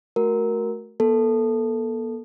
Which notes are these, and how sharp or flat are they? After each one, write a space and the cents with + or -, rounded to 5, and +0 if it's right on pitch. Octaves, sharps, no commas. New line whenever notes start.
A3 -25 F#4 +0 A#4 +0
B3 -45 A4 +0